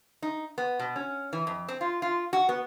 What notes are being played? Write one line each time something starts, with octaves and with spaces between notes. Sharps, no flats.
D#4
B3
B2
C#4
E3
F2
C4
F4
F4
F#4
B3